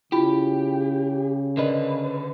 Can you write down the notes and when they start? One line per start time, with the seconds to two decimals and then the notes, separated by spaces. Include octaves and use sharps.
0.12 C#3 E4 F4 G4 B5
1.57 D3 A#4 B4 D5 D#5